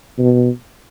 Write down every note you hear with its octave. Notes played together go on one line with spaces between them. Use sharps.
B2